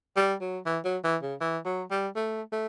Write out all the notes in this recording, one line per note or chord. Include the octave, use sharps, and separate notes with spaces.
G3
F#3
E3
F#3
E3
C#3
E3
F#3
G3
A3
A3